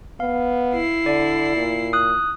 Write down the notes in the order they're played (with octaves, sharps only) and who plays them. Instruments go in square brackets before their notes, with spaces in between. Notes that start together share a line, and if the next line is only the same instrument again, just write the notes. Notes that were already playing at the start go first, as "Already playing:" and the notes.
[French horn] B3 [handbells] F5
[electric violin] E4 C7
[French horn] D3 [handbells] D5
[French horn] A#2
[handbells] D#6 F#6